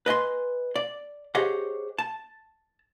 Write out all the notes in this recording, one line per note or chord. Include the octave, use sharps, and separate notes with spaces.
B4 D#5 G#5 C6
D5
G4 G#4 C5 C#5 D#5 F#5
A5